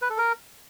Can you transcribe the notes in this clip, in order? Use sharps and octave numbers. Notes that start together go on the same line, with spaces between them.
B4
A4
A#4